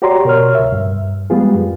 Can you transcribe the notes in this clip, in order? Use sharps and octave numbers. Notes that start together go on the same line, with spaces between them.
F#4 G4 C#5 D5 A#5 C6
B2 A#4 C#5 F6
C#2 E5
G2
G3 G#3 B3 F4 G#4
F#2